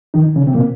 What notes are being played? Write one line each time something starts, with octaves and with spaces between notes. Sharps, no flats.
D#3 D#4
C#3 C#4
C3 C4
A#2 A#3